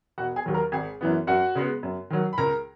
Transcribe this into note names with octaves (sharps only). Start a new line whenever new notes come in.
E1 F#4 F#5
G#4 G#5
D#2 D#3 F#3
A#4 A#5
G#1 G#4 G#5
F#2 E3 B3
F#2 F#4 F#5
C#3 G#3 B3
F#2
D#3 F#3
B5
C#2 A#4 A#5